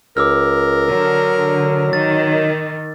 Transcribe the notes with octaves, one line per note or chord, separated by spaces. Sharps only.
C#2 A#4 D6 E6 F6
D3 F#3
D#3 A6